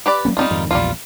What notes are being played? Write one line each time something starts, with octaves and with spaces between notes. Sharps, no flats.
G4 B4 D5
F#3 A#3 C#4
D2 G3 G#3 C4 D#4 F4
F2 G#2 D#3
A#1 E2 G3 A#3 F4